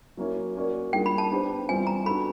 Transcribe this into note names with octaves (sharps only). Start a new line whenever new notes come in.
F#3 A#3 C#4 E4
A#3 C#4 F#4 A#4 D5
G3 A#3 D4 F4 G#4 G5
B5
A5
B3 D4 G4 C5
E3 G3 C4 F4 G#5
A#5
B3 D4 F#4 A4 B5